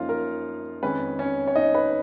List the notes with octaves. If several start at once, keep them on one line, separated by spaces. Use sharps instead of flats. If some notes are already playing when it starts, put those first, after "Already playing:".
Already playing: F#2 F3 A#3 C#4 D#4 F4 F5
A#4
F2 D#3 G#3 C#4 B4
C#4 C#5
C#5
D#4 D#5
B4 B5